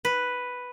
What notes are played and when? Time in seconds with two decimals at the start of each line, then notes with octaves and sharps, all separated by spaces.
0.05 B4